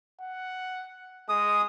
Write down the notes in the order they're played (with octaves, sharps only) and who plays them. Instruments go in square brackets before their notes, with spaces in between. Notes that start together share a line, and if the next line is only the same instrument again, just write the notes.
[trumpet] F#5
[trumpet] G#3 [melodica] D#6